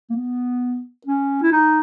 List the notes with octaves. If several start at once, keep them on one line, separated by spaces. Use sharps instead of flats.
A#3
B3
C#4
E4
D#4